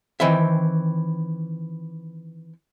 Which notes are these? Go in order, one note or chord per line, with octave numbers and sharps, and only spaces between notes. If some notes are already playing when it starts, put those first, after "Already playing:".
D#3 E3 C4 E5